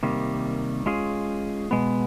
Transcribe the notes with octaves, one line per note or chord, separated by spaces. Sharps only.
C3 D#3 G3 A#3
G#3 C#4 F4 G#4
B2 G#3 B3